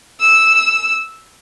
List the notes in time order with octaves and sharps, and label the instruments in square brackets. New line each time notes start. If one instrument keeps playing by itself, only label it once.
[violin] E6